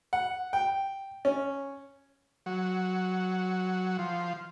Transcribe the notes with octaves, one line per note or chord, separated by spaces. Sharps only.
F#5
G5
C#4
F#3
F3